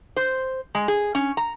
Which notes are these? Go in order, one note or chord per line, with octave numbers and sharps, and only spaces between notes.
C5
G#3
G#4
C#4
A#5